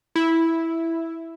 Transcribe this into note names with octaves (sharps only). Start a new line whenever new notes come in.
E4